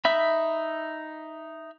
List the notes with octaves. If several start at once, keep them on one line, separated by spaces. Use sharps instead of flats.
D#4 E5 B5